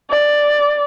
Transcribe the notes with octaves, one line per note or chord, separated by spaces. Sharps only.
D5